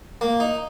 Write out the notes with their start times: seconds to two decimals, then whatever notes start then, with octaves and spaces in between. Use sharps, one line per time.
0.21 A#3
0.40 D#4